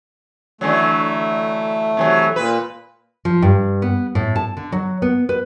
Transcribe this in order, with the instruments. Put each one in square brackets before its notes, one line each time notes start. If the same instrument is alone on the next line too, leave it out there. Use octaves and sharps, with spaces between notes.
[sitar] D3 E3 F#3 [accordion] A3
[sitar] C3 E3 F#3
[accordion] A#2 [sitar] B4
[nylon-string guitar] F3
G2
B3
A2
A5
D3
F#3
B3
B4